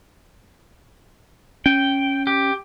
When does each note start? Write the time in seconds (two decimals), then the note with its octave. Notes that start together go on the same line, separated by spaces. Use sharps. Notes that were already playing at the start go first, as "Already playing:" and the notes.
1.66 C#4 G5
2.27 G4